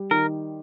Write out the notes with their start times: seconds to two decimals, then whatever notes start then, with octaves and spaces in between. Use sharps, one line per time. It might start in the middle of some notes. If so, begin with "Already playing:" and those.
Already playing: G3
0.11 D#3 A#4